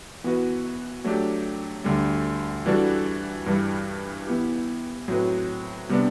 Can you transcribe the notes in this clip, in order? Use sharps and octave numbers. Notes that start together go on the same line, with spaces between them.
E3 B3 F#4 B4
F#3 A3 D4 G4
D2 D3 G3
E3 G3 D4 F#4 A4
G2 E3 G3
E3 B3 E4 G4
A2 F#3 C4 F#4 B4
C3 G3 B3 D4